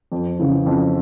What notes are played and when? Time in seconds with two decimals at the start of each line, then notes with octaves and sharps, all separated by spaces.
0.12 F2
0.39 C#3 E3
0.66 F2